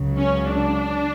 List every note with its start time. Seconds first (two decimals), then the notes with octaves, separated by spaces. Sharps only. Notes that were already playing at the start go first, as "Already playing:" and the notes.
Already playing: C#2 C#3 F#3
0.17 C#4
0.47 D4